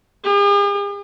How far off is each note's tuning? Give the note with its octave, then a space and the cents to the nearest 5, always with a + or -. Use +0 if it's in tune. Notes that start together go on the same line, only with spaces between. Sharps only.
G#4 -45